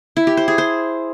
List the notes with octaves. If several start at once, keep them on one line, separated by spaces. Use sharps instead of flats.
E4
G4
C5
G#4
C5